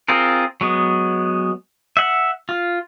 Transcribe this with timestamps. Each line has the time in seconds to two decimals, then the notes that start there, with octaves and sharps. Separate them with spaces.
0.08 C4 F4 G#4 A#4
0.61 F#3 G#3 B3
1.97 E5 F#5
2.49 F4